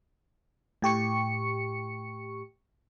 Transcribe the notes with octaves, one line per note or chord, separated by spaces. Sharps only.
A2 G4 C#6 C#7